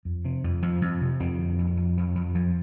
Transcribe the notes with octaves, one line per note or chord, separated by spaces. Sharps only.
F2
C3
F2
F2 F3
F2
C3
F2 C4
D3
F2
F2
F2
F2
F2 F3